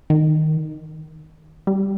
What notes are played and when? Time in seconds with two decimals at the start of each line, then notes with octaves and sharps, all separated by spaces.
0.10 D#3
1.67 G3